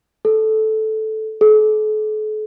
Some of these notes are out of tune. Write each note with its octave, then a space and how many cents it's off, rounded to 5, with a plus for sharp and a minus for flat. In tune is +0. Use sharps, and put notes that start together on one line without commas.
A4 -10
A4 -40